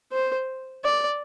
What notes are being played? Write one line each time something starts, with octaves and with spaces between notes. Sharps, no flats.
C5
D5